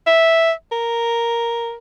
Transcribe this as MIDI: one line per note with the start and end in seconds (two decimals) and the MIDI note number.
0.07 0.52 76
0.72 1.77 70